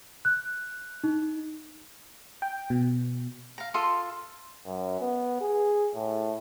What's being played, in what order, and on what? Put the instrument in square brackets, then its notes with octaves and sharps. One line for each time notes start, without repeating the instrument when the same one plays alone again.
[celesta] F#6
D#4
[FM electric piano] G5
B2
[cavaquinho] F5 A#5
F4 A4 C6 D#6
[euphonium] F#2
B3
G#4
A2